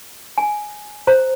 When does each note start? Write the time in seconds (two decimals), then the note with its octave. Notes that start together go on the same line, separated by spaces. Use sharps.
0.38 G#5
1.07 C5 A#5